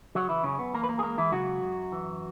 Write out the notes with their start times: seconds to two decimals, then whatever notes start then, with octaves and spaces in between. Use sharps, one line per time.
0.15 C#3 F#3 F#4
0.29 E3 E4
0.44 F#2 C#3 C#4
0.59 B3
0.73 E3 A#3 A#4
0.83 B4
0.89 A#3 A#4
0.99 G#4
1.03 G#3 A#3 A#4
1.18 E3 E4
1.32 C#3 F#3 F#4
1.63 F#2
1.92 E3